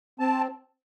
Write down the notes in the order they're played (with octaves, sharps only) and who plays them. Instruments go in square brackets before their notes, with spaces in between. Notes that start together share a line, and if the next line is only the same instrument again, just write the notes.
[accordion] C4 A5